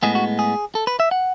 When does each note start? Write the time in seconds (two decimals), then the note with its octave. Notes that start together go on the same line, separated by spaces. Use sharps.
0.03 A2 G#3 B3 G#4
0.15 F#4
0.39 G#4
0.75 A4
0.87 B4
1.00 E5
1.11 F#5